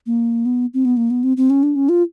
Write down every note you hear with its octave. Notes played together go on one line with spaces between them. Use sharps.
A#3
B3
C4
B3
A#3
B3
C4
C4
C#4
D4
C#4
F4